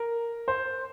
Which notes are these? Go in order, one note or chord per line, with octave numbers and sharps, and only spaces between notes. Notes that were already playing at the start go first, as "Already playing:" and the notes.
Already playing: A#4
C5